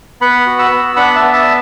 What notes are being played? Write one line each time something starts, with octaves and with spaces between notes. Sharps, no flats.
B3 F#5 B5
F#4
B5 E6
B3
D4 F#5 B5
E5 A5
B3
E5 A5